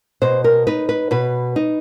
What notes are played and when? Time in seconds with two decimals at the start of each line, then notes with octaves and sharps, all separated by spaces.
0.22 B2 C5
0.44 A#4
0.67 D#4 B4
0.89 B4
1.11 B2 B4
1.56 D#4